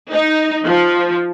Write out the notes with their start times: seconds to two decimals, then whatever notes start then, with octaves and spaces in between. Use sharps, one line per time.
0.12 D#4
0.65 F3